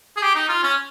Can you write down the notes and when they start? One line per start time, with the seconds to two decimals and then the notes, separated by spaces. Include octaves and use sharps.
0.16 G#4
0.22 G4
0.35 D#4
0.49 F4
0.63 C#4